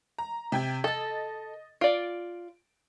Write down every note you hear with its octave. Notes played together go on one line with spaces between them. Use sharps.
A#5
C3 G5 G#6
A4 D#5 A6
F4 D5 D7